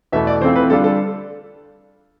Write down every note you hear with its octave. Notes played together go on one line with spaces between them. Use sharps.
E2 B2 A3 E4 E5
D5
E3 A3 C4 F4 C5
B4
D3 G3 D4 F4 A4
A4